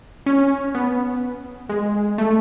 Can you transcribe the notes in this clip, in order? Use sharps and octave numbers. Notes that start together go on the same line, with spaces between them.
C#4
B3
G#3
A3